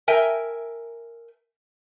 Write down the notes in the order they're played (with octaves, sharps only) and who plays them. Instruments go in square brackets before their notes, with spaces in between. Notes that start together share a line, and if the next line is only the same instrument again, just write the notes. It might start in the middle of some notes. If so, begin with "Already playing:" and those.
[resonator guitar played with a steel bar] A#4 E5 G5 G#5